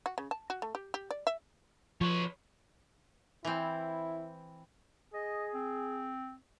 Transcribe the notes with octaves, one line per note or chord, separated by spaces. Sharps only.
F#4
C#3
A5
F#4
A3
G4
G4
D5
E5
F3 B4 C#5
E3 C4 E4
G#4 D#5
C4